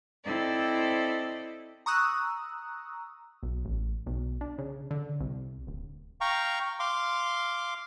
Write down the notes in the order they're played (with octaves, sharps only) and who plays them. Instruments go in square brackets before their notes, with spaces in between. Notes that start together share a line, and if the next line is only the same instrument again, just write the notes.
[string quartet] C4 E4 A4 D5 D#5
[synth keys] A#5 C#6 D#6 E6 F#6
[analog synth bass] B1
A1
B1
D4
C#3
D3
C2
D1
[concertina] F5 G5 A#5 C#6
F5 C6 D6